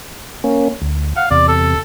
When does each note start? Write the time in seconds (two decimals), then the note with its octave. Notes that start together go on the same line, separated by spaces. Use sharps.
0.44 A#3 C#4
0.82 D2
1.16 F5 F#5
1.31 E2 C3 D5
1.48 A4